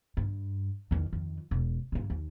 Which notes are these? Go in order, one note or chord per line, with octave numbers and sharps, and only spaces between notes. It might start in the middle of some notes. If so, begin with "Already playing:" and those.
G2
E2 D#3
F2 D#3
E1
G2 D3
D#2